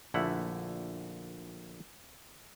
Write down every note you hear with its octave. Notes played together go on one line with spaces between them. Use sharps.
A#1 D3 A3 E4 F#5